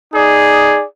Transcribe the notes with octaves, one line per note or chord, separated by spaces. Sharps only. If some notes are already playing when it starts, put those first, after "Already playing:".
D#4 G#4 D5